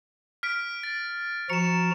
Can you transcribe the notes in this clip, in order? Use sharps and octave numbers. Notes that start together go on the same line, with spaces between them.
F6 B6 D7
A6
F3 F#4 A#5 C#7 E7